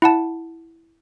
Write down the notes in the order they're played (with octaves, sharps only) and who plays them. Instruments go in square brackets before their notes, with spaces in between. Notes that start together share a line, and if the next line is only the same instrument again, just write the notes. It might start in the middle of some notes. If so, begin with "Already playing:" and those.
[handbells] E4 F#5 A5